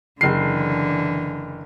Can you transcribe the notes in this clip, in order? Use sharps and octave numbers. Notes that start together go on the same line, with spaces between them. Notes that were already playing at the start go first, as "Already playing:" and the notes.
F#1 D3 E3 C7